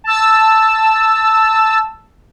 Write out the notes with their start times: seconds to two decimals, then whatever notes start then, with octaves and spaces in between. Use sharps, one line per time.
0.04 A5 E6